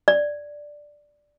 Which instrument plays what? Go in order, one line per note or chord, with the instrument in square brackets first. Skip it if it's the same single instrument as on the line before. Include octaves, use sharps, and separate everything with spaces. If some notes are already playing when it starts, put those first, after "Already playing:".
[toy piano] D5